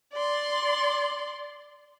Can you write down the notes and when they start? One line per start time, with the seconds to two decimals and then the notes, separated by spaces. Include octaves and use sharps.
0.13 D5 C6